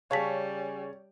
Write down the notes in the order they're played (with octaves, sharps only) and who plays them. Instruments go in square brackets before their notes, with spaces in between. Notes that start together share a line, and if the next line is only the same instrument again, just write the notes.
[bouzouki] C#3 C#4 [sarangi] G3 [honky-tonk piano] C#5 [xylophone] F5 A5 B6